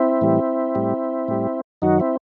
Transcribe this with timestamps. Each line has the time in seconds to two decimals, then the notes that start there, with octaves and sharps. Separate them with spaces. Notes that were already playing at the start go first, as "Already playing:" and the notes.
Already playing: C4 E4
0.21 A2 E3 G3
0.75 A2 G3
1.28 A2 G3
1.82 F#2 D#3 F#3 D#4 F#4
2.00 C4 E4